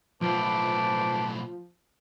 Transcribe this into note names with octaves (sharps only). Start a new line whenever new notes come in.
B1 A2 F3 B4 C5 A5 D6